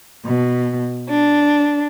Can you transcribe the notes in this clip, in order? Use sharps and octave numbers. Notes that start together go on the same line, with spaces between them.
B2
D4